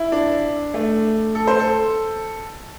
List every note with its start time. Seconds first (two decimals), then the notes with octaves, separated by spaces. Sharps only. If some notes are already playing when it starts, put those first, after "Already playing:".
Already playing: E4
0.12 D4
0.74 A3
1.35 A4
1.47 C5
1.60 A4